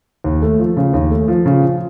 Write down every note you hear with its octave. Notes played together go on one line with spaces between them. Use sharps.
D#2
A3
F3
C#3
D#2
A3
F3
C#3
F3